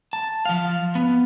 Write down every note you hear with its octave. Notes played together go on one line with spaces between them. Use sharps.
A5
F3 F5
B3